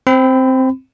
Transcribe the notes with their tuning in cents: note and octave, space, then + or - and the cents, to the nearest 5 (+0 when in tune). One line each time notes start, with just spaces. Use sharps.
C4 +0 B5 +30